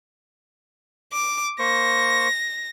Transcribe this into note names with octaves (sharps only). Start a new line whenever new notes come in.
D6
A#3 C5 C#6 A#6